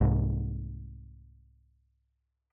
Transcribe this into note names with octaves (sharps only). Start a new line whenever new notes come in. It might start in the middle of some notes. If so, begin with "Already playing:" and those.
C2 G#2